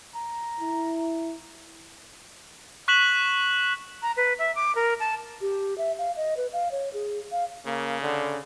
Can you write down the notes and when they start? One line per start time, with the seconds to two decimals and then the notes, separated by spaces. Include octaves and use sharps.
0.15 A#5
0.60 E4
2.88 C#6 F#6 B6 E7 F#7
4.02 A#5
4.17 B4
4.39 E5
4.55 D6
4.75 A#4
5.00 A5
5.41 G4
5.78 E5
5.98 F5
6.17 D#5
6.37 B4
6.53 F5
6.72 C#5
6.94 G#4
7.32 F5
7.66 C#3 A#3
8.02 D3